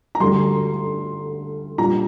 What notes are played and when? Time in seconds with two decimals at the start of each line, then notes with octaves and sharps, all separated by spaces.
0.15 A#5
0.20 D2 D3 G3 C6
1.78 A#2 G3 D4 A#5